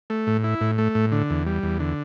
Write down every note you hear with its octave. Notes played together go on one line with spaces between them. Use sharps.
A3
A2
E4
A2
A3
A2
D3
E2
G3
E2
D3